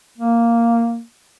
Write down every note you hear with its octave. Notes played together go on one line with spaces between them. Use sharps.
A#3